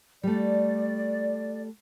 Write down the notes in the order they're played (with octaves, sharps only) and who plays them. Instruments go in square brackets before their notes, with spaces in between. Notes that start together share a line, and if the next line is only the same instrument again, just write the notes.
[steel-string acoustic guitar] G3 A3 [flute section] D5